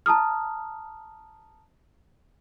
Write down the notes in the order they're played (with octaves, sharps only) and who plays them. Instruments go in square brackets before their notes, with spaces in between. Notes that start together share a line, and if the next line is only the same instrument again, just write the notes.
[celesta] A5 A#5 D#6 F6